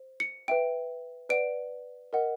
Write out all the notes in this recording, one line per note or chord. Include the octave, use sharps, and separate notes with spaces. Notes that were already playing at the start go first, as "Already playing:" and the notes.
Already playing: C5
C#7
B4 E5 G5 D7
B4 D5 F#5 D7
A#4 D#5 F#5